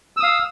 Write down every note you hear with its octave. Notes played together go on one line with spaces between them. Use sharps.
F5 D#6 E6